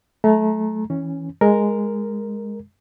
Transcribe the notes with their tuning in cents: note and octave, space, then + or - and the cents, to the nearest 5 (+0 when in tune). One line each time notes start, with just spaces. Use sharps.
F#3 +0 A3 -25 A#5 +0
E3 -15 C#4 +0
G#3 -5 A#4 +0